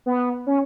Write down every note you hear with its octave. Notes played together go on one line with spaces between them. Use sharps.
B3
C#4